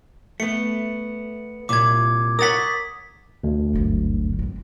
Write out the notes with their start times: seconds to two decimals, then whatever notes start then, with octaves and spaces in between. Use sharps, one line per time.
0.40 A3 B3 C#7
1.69 C2 A#2 C#5 D6 G#6
2.39 A#4 C#5 F#5 D#6 A6 B6
3.44 D2
3.73 G1 F#2
4.39 C4 D4